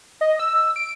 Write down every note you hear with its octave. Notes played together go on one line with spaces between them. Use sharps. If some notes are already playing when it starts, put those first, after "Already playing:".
D#5
E6
D7